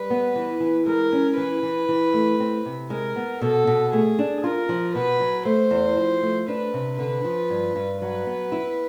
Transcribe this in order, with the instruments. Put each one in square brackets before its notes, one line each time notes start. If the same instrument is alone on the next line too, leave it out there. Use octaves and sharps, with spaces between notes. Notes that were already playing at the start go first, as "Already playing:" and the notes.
Already playing: [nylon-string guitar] G3 [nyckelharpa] B4
[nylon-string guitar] B3
E3
E3
[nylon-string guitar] G#3 [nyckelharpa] A#4
[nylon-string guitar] C#4
[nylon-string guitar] E3 [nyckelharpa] B4
[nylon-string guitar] E3
E3
A3
C4
C3
[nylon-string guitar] G#3 [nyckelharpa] A#4
[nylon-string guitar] B3
[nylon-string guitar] B2 [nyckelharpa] A4
[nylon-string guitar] B2
[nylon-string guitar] A3 [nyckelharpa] G#4
[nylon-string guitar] D4
[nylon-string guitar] F4 [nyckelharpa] A#4
[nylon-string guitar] F3
[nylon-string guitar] B2 [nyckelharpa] B4
[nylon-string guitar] F#3
[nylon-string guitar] A3 [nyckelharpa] C5
[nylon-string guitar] E2
F3
A3
[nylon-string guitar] D4 [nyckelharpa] B4
[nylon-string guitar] C3
[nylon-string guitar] D3 [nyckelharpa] B4
[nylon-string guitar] F3
G2
G2
[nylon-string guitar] F#3 [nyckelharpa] B4
[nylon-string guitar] B3
E4